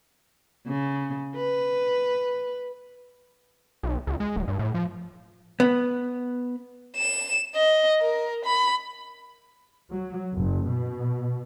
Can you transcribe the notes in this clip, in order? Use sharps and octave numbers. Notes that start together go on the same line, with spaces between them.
C#3
B4
B1
C#2
G#3
D1
G2
A2
F3
B3
E7
D#5
A#4
B5
F#3
F#1
B2